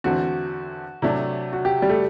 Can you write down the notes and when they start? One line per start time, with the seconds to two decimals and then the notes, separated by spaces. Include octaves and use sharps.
0.04 E2 D3 A3 C4 F#4
1.02 C3 F#3 A3 D4
1.53 F#4
1.65 G4
1.82 G3
1.89 A3